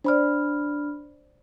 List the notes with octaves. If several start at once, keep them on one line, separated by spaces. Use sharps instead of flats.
D4 C5 D5 B5 F6